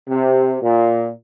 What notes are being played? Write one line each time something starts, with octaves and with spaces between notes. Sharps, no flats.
C3
A#2